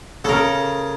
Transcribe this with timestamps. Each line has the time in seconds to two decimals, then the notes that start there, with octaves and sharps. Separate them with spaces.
0.25 C#3 A4 A#4